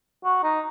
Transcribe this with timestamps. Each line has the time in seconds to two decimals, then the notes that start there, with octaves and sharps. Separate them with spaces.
0.24 F#4
0.43 D#4